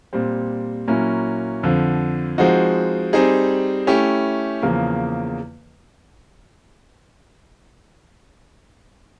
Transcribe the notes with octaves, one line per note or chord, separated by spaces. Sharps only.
A#2 G3 C4
A#2 F#3 A#3 C#4 E4
F2 D3 F3
F3 G#3 C4 D#4 F#4
G3 C4 D#4 G#4
A3 C#4 E4 G4
E2 C#3 F3 A#3